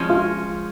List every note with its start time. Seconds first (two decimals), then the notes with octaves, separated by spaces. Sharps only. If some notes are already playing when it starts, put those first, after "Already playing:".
Already playing: F3 G#3 C#4
0.09 F4